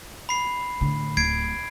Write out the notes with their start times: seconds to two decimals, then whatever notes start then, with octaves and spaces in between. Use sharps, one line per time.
0.29 B5 C7
0.81 A2 D3
1.17 D1 G#6 C7 D7